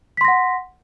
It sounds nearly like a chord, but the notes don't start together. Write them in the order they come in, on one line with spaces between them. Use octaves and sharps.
B6 C6 A#6 F#5